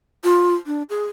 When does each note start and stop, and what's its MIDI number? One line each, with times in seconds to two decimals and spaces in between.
0.24 0.54 65
0.66 0.82 62
0.90 1.05 68